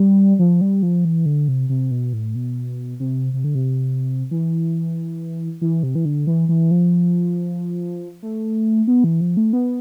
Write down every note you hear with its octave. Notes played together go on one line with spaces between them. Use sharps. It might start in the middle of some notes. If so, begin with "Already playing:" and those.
Already playing: G3
F3
G3
F3
E3
D3
C3
C3
B2
A2
B2
C3
C3
D3
C3
E3
E3
C3
E3
D3
E3
E3
F3
A3
B3
E3
F3
A3
B3